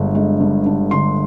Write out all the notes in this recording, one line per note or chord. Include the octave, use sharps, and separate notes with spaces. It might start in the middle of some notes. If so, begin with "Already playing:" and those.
Already playing: G1 D3 G#3
G#3
G2
D3
D3 C6